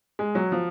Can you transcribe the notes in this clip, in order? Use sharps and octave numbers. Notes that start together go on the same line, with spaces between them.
G#3
F#3
F3